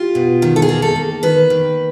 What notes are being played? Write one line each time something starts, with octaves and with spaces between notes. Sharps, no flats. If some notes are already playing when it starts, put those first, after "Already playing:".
Already playing: F4 G4
B2
D#3
A4
G#4
A#3
A4
A#3
D#3 B4
D#3